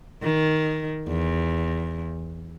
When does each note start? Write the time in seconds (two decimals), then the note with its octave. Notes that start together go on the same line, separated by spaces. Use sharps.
0.22 D#3
1.07 E2